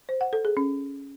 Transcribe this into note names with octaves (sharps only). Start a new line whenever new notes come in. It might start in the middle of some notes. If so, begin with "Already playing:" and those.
C5
F#5
A4
G#4
C#4